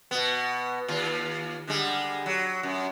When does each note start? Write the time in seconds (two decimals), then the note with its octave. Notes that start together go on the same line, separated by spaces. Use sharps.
0.11 B2 B3
0.88 D#2 F4
1.67 D3 G3 G#3
2.26 F#3
2.63 F#2